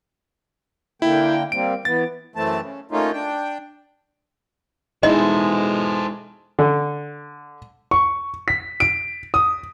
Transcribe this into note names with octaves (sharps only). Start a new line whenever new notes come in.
D3 A#3 E4 G5
G3 A#3 C4 D7
E3 B3 A6
F#2 E3 A3 C4 A5
C#3
A3 A#3 C#4 D#4 F4
D4 G5
B2 G#3 D#4 E4 A4 C5 D#5
D3
C#6
B6
D7
D#6